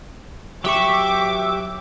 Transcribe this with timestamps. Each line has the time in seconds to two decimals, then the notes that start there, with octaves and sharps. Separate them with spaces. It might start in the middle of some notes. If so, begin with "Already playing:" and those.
0.64 F#3 G4 E5 G5 C#6 D6